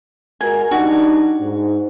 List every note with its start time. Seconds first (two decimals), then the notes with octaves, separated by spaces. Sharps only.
0.41 G#3 F#4 A#4 G#5
0.71 G3 D4 D#4 F#4
1.40 G#2